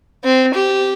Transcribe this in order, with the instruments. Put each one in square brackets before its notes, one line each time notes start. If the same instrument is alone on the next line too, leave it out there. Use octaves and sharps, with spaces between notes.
[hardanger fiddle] C4
G4